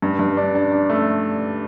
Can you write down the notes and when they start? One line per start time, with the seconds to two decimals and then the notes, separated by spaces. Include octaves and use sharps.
0.02 G2
0.19 G2
0.37 D4
0.55 D4
0.72 D4
0.89 A3